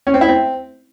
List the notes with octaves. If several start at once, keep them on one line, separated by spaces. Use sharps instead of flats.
C#4
C4
E4
C4